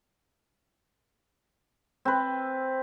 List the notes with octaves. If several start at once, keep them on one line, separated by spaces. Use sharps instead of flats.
C4 B4